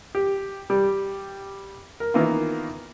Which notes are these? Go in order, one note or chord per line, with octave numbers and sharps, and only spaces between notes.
G4
G3 G4
A#4
D#3 E3 A#3 B3 E4 F4